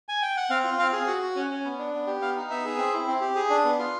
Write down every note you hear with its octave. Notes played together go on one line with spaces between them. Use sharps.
G#5
G5
F#5
C4 F5
F4
C4 F5
G#4
F#4 F#5
F#4
C#4
C#4
B3
D4
B3
G4
B3 F5
D#4
B3 E5
G#4
C4
E4
C4
G4
G#4
D4
B3
F4